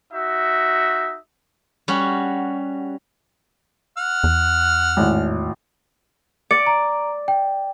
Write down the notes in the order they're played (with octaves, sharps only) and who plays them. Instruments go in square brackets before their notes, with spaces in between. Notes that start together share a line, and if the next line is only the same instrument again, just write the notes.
[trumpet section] D#4 F#4 E5
[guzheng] G3 C#4 F#4
[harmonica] F#5 F6
[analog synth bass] E2
[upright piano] G#1 A2
[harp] D5 [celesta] C#7
[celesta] A#5
G5